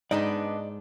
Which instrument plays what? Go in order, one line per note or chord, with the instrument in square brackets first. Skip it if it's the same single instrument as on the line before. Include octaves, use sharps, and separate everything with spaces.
[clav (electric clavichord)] G#2 [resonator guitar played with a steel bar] B3 D4 D#4 [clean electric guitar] D5 D#5